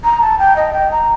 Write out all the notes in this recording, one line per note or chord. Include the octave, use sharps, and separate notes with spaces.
A#5
A5
G5
D#5
G5
A#5